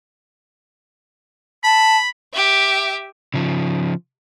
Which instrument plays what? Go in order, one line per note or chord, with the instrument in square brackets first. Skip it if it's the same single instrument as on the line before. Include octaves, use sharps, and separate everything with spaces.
[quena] A5 [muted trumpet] B5
[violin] G4 E5
[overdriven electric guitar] C#3 F3